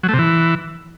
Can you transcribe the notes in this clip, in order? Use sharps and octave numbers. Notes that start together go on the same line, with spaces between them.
F#3
A3
C3
E3